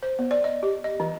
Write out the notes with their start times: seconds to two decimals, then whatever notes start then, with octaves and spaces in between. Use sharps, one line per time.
0.03 C5
0.19 B3
0.31 D5
0.44 D#5
0.63 G4
0.84 D#5
1.00 E3